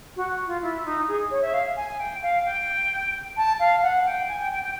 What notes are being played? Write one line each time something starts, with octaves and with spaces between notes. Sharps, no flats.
F#4
F4
E4
D#4
G#4
C#5
E5
F5
G#5
G#5
G5
F5
G5
A5
F5
F#5
G5
G#5
G5
G5
G5